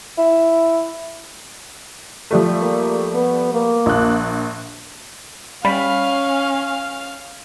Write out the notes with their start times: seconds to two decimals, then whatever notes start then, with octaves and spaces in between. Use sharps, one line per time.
0.18 E4
2.31 F3 G3 A3
2.62 A#3
3.14 B3
3.54 A#3
3.86 A#1 F#6
5.65 G3 C#4 F5 B5